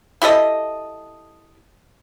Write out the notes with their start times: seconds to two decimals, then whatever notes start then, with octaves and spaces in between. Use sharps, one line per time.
0.22 E4 G4 A4 D#5